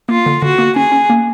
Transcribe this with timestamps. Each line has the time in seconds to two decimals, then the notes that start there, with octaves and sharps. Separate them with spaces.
0.09 A#3 F4
0.26 D3
0.42 D3 F#4
0.58 A#3
0.76 C#4 G#4
0.92 C#4
1.10 A#3